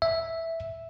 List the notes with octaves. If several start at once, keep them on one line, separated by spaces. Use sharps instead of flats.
E5